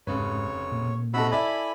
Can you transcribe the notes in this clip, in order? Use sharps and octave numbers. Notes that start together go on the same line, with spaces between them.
F1 G#2 C#3 B4 C#5
A#2
C3 D#4 F#4 A4 B5 E6
E4 A4 D5 E5 G#5 B5